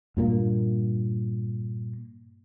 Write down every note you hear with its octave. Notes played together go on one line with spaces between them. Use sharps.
G2 A#2 A#3